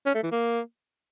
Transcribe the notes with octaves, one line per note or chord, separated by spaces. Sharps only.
C#4
A3
E3
A#3